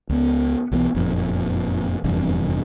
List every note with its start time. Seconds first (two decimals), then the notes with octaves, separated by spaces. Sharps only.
0.09 C#2 B3
0.71 B1 E3 F3 B3
0.94 F#1 F2 A#2
2.04 F1 E2 G2 C3